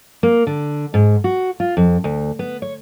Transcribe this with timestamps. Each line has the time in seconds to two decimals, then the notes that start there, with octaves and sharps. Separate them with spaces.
0.23 A#3
0.47 D3
0.94 G#2
1.24 F#4
1.60 F4
1.77 F2
2.04 D2
2.39 B3
2.62 C#5